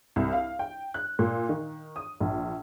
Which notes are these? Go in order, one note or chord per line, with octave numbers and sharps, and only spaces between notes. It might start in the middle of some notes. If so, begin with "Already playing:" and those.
C2
F5
G5
F#6
A#2
D#3
D#6
A#1